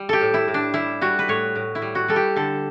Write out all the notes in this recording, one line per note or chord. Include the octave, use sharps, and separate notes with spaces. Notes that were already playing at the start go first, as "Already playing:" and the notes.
Already playing: G3
G4 A4
A2
E4
A2
D4
G3 E4
G3 F#4
B4
A2 C#5
A2
E4
G3
F#4
G3 A4
G4
D3 A4